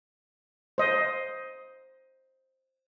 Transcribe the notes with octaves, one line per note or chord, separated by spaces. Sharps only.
C5 D#5